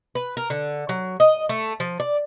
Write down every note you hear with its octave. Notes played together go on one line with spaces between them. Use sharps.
B4
A#4
D3
F#3
D#5
A3
F3
D5